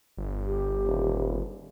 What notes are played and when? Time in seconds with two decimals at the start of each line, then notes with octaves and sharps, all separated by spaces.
0.17 G1
0.46 G4
0.87 D#1